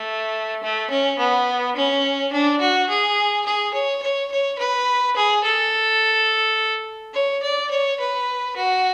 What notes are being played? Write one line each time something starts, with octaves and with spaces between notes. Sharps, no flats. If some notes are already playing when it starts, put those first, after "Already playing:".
Already playing: A3
A3
C#4
B3
C#4
D4
F#4
G#4
G#4
C#5
C#5
C#5
B4
G#4
A4
C#5
D5
C#5
B4
F#4